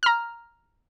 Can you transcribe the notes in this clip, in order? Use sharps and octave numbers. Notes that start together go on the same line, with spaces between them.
A#5 F6